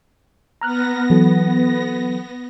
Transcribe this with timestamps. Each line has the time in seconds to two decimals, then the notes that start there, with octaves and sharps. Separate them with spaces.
0.61 B3 A#5 F6 F#6 A#6
1.10 E3 F#3 A4